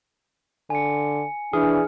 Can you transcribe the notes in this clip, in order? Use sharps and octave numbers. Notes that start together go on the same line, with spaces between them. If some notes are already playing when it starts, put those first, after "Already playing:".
D3 G#5 C#7
E3 D4 G#4 F6